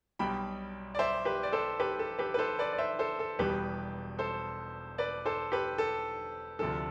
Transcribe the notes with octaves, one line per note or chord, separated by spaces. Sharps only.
B1 B2 G3 G5 B5
D5
C5 E5
G4 B4
D5
A4 C5
G4 B4
A4
G4 B4
B4
A4 C5
B4 D5
D5
C5 E5
A4 C5
A4
E1 E2 B2 G3 G4 B4
A4 C5
B4 D5
A4 C5
G4 B4
A4
D2 C3 F3 A4